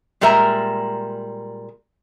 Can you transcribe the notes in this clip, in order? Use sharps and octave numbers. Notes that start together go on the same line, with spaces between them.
A#2 G3 G#3 A#4 E5 A#5